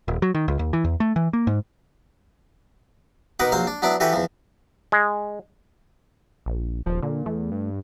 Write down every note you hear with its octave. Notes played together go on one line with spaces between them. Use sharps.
D#1
F#3
D#3
C#2
D#2
E3
E2
A3
E3
A#3
G#2
B2 D#4 A#4 B4 F#5 D6
A#1 F#3 C5 F5
D4
F#3 B3 D4 E4 D5
E3 F#4 G4 A4 B4
E2 F3
G#3
A#1
D#1 F3
A#2 D3
E2 A3
G2